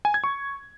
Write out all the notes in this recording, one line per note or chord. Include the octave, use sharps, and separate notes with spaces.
G#5
G#6
C#6